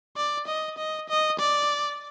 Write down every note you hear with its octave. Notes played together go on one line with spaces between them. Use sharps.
D5
D#5
D#5
D#5
D5